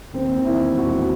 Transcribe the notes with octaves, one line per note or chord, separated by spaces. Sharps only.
D#2 C4
D#3
E4
E1
F#4
E1